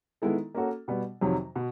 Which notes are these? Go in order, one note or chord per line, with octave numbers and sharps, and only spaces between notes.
D#3 G#3 B3 E4 A4
A#3 C#4 F#4 A4
B2 G3 B3
F2 C3 D#3 F#3
B2